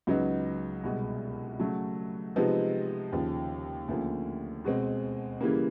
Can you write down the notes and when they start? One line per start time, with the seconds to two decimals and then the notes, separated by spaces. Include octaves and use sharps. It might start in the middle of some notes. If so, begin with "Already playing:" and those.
0.07 C#2 C#3 F#3 B3 D#4
0.84 C2 B2 G#3
1.60 C#3 F#3 A3
2.36 C3 F3 G#3 B3 D#4
3.12 D#2 C#3 F3
3.88 D2 C#3 F3 A#3
4.64 B2 G#3 C4
5.41 C#3 E3 G3 A#3